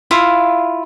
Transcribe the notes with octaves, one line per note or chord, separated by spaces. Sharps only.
E4 F4 F5